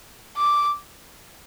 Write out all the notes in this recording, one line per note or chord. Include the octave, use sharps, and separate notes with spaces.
D6